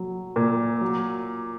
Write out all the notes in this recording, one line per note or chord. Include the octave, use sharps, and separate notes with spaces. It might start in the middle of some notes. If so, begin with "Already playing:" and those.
Already playing: F#3
A#2
F#3